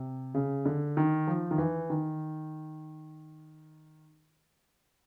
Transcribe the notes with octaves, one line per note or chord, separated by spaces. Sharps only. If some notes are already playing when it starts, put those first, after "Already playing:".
Already playing: C3
C#3
D3
D#3
F3
D#3
E3
D#3